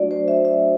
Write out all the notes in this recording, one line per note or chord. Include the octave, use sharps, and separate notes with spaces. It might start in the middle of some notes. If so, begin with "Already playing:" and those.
Already playing: F#3 A3 D4 F#4 D5
C5
E5
E5